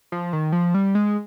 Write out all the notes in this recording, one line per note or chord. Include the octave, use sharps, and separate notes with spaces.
F3
D#3
F3
G3
G#3